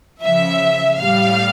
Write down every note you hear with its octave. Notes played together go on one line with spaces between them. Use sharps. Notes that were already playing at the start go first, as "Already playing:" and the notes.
C#3 F3 E5
A2 G3 F5